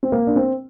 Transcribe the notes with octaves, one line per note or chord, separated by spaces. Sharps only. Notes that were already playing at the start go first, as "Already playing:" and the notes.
C4
A#3
D4
C4